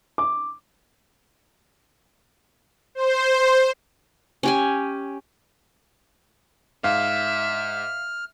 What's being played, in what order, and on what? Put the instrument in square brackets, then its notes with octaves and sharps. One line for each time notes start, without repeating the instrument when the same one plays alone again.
[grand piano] D6
[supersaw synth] C5
[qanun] C#4 G4 G#5
[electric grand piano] G#2 [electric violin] E5 [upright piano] F5 [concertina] F6